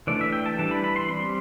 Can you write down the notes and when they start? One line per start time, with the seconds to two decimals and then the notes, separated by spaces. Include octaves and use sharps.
0.07 E3 A3 D4 D5
0.21 E5
0.33 G5
0.46 A5
0.58 E3 G3 D4 A5
0.71 B5
0.84 B5
0.96 C6
1.09 G3 C4 C6